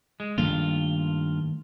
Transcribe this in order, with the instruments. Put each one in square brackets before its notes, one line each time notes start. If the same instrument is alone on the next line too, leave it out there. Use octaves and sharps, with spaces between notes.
[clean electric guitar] G#3
[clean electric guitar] G2 F4 [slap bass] D#3 A3 A#3